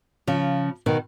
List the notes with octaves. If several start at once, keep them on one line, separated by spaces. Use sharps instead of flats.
C#3 F3
B2 D#3